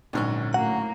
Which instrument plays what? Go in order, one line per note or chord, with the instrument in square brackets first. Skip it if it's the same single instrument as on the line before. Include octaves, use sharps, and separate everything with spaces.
[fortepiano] A#1 G#2 C#6 [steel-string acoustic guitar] D3 F#3 C#4
[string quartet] A2 A#3 [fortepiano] F#4 [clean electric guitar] F#5